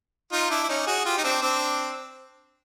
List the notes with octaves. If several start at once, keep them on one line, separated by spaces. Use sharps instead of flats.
D#4 F4
D4 E4
E4
C#4 D#4
F#4 G#4
F4 G4
D#4
C4 D4
C4 D4